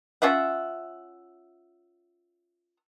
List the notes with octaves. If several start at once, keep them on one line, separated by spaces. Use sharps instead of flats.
C#4 F4 E5 F#5